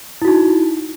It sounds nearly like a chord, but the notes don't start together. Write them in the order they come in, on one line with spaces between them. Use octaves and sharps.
E4 F#4 D#4